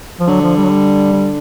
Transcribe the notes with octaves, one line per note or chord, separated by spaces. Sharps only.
F3
D3 F#3
F3
G3
F#3
G3
D3